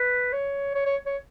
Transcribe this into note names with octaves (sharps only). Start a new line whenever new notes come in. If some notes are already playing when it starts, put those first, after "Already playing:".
Already playing: B4
C#5
C#5
C#5
C#5